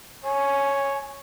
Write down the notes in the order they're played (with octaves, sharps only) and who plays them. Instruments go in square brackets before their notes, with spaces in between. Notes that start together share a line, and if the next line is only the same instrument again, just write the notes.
[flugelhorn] C#5 [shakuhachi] G#5